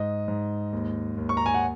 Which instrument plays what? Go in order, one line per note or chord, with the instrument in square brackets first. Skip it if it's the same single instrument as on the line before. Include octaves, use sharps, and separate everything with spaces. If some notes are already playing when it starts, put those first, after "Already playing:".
Already playing: [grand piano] G#2 D#5
G#2
D#2
D#2
C#6
A#5
G#5
F#5